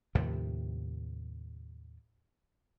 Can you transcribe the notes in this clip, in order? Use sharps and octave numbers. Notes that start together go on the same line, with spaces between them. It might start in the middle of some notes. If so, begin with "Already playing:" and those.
D#2 A2 C3 F3